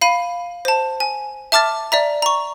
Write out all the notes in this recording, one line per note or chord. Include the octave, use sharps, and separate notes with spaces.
F5 B5 D#7
C5 A5
G#5
E5 A5 D6 F6 A6
D5 E5 A#5
A#5 C#6